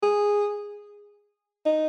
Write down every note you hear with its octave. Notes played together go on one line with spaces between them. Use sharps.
G#4
D#4